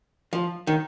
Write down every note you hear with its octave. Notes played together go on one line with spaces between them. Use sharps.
F3
D#3